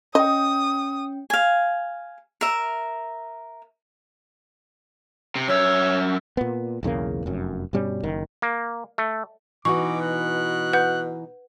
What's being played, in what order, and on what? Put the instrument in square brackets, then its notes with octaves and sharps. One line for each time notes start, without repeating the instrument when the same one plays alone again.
[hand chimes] C#4 G5 [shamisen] D#5 [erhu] D#6
[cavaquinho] F5 G#5
A#4 E5
[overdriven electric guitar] C3
[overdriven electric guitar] F#2 E5 [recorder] C#5
[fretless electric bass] A#2 B3
B1 E2 C#3 A#3
F1 F#2
G2 B2 G3 C#4
F#1 D#3
[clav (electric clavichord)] A#3
A3
[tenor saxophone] B2 [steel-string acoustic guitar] E3 D#4 F#4 [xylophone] C#6 [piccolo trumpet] D6
[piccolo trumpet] F#6
[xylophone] B4 F#5 G6